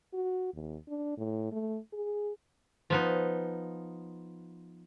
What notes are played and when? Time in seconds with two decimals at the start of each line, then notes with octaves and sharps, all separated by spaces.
0.13 F#4
0.54 D#2
0.88 D4
1.17 A2
1.52 A3
1.93 G#4
2.90 F3 B3 D#4